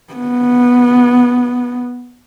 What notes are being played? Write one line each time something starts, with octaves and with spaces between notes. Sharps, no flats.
B3